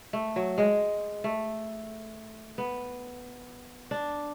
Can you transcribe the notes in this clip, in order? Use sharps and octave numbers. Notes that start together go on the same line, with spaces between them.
A3
F#3
G#3
A3
B3
D4